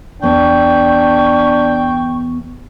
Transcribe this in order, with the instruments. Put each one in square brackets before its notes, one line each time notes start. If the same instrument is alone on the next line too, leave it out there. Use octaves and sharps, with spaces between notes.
[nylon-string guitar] E2 B3 [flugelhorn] D4 [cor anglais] G5 [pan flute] C#6